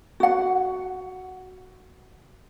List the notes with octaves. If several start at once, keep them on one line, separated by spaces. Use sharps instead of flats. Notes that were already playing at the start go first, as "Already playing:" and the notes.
F#4 F#5